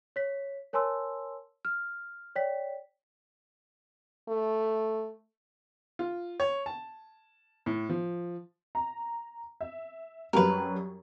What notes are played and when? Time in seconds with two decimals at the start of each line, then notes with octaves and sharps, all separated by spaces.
0.16 C#5 B6
0.73 A#4 C#5 G#5 A5 C6 E6
1.65 F6
2.36 C#5 D5 G5 B6
4.28 A3
5.99 F4
6.40 C#5
6.66 A5
7.66 A2
7.89 F3
8.75 A#5
9.61 E5
10.33 F#2 F#3 G3 A#4 B4